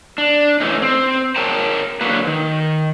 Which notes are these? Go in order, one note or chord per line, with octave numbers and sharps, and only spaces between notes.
D4
E3 A3 C#4 D#4
C4
A#4 C#5 G5 A5 A#5
D3 F#3 A#3 B4
D#3